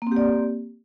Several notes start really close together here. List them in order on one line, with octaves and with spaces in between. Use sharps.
A#3 C4 G4 D5